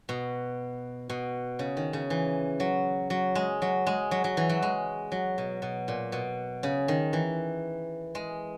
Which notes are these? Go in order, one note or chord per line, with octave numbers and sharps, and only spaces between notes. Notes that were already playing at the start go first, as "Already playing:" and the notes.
B2
B2
C#3
D#3
C#3
E3
F#3
F#3
G#3
F#3
G#3
F#3
F#3
E3
F#3
G#3
F#3
B2
B2
A#2
B2
C#3
D#3
E3
G#3